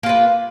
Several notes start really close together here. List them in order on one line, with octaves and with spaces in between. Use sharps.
A#3 F4 B4